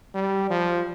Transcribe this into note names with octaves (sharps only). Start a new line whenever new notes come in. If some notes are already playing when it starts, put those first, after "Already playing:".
G3
F3